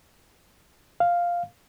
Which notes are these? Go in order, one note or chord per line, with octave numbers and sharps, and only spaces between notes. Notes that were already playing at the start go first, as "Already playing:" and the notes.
F5